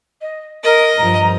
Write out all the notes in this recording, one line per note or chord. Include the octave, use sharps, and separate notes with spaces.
D#5
A#4 D#5
G2 F3 A#5